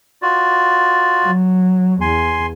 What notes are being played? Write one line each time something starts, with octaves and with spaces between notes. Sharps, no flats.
F4 F#4 D5
F#3
E2 G#5 C6